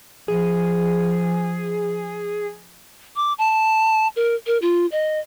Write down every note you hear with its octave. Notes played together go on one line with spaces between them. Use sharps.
F3 G#4
D6
A5
A#4
A#4
F4
D#5